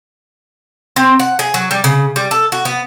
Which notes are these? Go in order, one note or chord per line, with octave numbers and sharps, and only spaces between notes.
C4
F#5
G#4
F#3
G3
C#3
G3
A4
F#4
B3